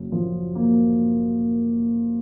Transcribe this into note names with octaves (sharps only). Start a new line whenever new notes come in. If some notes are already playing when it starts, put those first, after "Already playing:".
Already playing: F#1 F#2
F3
A#3